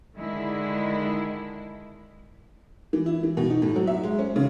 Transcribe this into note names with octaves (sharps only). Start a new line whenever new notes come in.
D3 D#3 G#3 D4 E4
E3
E4
E3
B2
D#4
A2
F#3
E5
G#3
C#4
C#3